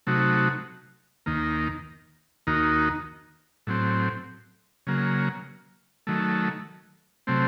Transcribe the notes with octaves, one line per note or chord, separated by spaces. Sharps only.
C3 F#3 A3 D#4 F#4
D#2 D#3 A#3
D#2 D#3 A#3 D#4 F#4
A2 F#3 C4
C#3 F#3 A#3
D#3 F#3 A3
C3 F#3 A3 C4